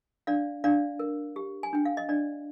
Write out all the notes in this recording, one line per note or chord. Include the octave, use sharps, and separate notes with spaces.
D4 D5 F5
D4 D5 F5
A#4
G4
G#5
D4 G5
F5
D#5
D4 D5